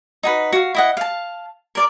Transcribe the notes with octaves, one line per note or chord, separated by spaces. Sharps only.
D#4 F#4 B4
F#4 F5
E4 D#5 F#5
F5 A5
A#4 D5 D6